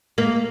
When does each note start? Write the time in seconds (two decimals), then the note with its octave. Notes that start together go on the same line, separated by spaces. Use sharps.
0.18 A#3